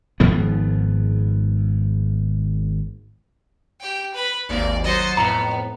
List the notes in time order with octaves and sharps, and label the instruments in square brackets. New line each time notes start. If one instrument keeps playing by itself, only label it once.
[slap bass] G#1 G#2 F3 B3
[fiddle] G4 G5
B4 B5
[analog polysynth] G#1 D#2 A#3 [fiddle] D5
[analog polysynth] F#3 A6 C#7 [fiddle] C5 D#5
[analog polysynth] F2 A2 [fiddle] B3 [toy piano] A#5